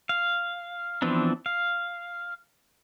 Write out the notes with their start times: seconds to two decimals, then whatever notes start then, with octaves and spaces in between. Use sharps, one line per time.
0.09 F5
1.02 E3 F3 B3 C4 D4
1.46 F5